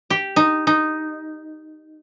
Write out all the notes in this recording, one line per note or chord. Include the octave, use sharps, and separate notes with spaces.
G4
D#4
D#4